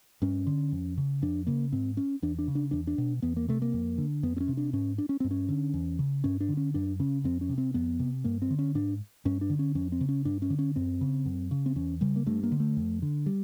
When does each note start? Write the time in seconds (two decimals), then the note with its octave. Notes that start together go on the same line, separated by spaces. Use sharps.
0.22 G2 C#4
0.47 D3
0.72 F2
0.98 C#3
1.22 F2 D4
1.47 C#3 A#3
1.72 G#2 C4
1.97 C#4
2.22 E2 D4
2.39 D4
2.48 C#3
2.55 D4
2.71 E2 D4
2.87 D4
2.98 B2
3.22 E2 B3
3.37 A#3
3.48 C3 A3
3.62 A#3
3.73 F2
3.98 D3
4.23 F2 B3
4.37 C4
4.40 C#4
4.48 C3
4.57 D4
4.73 G#2 C#4
4.98 D4
5.09 C#4
5.20 G2 C4
5.31 C#4
5.49 D3
5.74 E2
5.99 C#3
6.24 G2 C#4
6.40 D4
6.49 D3
6.57 C#4
6.74 F#2 D4
7.00 C#3 C#4
7.24 F2 C4
7.41 C#4
7.49 C3
7.58 C4
7.74 F2 B3
7.99 C3
8.24 G2 A#3
8.42 C4
8.50 D3
8.59 C#4
8.75 G#2 D4
9.25 G2 C#4
9.41 D4
9.50 D3
9.59 C#4
9.75 F2 C#4
9.92 C4
10.01 C#3
10.09 C#4
10.25 G2 D4
10.42 C#4
10.50 D3
10.59 C#4
10.76 F#2 C4
11.01 C#3
11.25 F#2
11.51 C#3
11.66 C4
11.76 E2 C#4
12.01 C#3 G3
12.16 A#3
12.27 G2 A3
12.43 A#3
12.52 D3
12.60 A3
12.77 F2
13.02 D3
13.26 G3